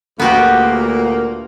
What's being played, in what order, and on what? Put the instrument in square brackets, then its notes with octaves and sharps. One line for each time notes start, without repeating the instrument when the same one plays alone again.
[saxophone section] D2 A#2 A#3 [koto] B3 F#4 G4